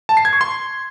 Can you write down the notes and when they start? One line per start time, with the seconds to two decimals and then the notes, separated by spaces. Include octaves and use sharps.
0.09 A5
0.17 C7
0.25 G#6
0.33 C#6
0.41 C6